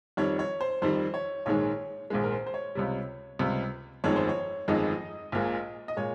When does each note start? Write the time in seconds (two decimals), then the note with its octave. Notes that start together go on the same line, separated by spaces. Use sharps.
0.17 F2 D#3 G3 C#5
0.39 C#5
0.61 C5
0.82 F2 D#3 G3 C5
1.14 C#5
1.46 A#1 G#2 D#3 G#3 C#5
2.10 A#1 G#2 D#3 G#3
2.24 A#4
2.32 C5
2.47 C5
2.54 C#5
2.75 C#2 C3 G3
3.39 C#2 C3 G3
4.04 G1 F2 D#3 G#3 C#5
4.16 C5
4.29 C#5
4.68 G1 F2 D#3 G#3 D#5
5.32 A#1 A#2 G#3
5.88 D#5
5.97 A#2 G#3 C#5